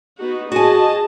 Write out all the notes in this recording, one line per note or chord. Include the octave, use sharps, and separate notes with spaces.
B3 D#4 F#4
F#4 G#4 D#5 G#5 A5